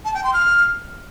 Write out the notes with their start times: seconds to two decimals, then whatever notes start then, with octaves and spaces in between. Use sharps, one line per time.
0.05 A5
0.14 G5
0.24 C6
0.33 F6